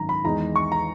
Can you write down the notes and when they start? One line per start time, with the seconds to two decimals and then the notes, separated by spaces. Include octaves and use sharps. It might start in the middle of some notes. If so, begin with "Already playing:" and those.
Already playing: G#1 F#2 D#3 A#5
0.09 B5
0.24 E2 D#3 G#3 D#4 A#5
0.56 C#6
0.72 A#5